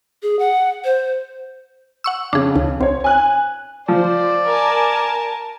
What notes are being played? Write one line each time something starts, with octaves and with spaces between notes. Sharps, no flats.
G#4
F#5
C5
F#5 C#6 E6
F2 C#3 D4 G#4
D2
C2 C5 C#5
G#5 F#6
F3 C5 D5
A#4 G#5 A5